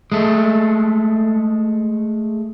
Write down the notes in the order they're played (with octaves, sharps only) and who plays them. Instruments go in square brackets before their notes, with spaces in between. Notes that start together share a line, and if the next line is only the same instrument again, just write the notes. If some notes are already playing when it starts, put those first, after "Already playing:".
[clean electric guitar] G#3 A3